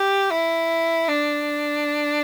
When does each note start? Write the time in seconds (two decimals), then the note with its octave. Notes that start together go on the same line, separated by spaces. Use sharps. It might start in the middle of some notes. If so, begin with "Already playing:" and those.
Already playing: G4
0.30 E4
1.08 D4